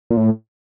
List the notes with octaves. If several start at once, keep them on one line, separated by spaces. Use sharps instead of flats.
A#2
A2